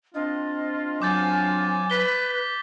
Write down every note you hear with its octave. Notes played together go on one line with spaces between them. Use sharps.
C4 D4 F4 D#5
F#3 G#5 D6 G6 A6
B4 B6 G7